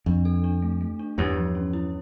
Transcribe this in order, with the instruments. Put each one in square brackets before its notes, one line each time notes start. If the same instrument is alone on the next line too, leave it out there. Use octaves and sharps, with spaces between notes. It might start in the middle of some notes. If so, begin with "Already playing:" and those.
[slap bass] F2 [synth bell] D4
[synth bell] A4
D4
A3
A3
D4
[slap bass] E2 G2 [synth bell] C#5
[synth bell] F3
C#4
E4